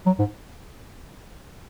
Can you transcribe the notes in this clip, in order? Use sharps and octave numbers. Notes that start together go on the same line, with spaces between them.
F#3
G#2